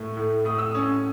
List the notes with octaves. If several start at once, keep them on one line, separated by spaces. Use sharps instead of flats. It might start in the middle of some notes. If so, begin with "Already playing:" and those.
Already playing: A2 A3
A2
A2 D#6
E6
C#4 D#6